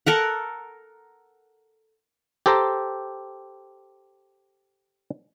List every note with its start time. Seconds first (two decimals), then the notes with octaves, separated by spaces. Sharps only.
0.07 A4 A#4 F#5
2.46 G4 A4 C5 G5 A#5